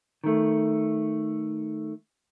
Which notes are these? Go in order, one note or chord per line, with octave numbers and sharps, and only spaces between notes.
D#3 A3